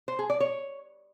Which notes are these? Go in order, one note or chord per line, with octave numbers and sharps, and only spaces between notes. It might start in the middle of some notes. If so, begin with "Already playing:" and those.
C5
G#4
D5
C#5